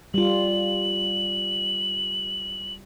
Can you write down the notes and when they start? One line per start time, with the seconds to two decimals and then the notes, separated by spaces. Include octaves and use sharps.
0.14 G3 F4 F#7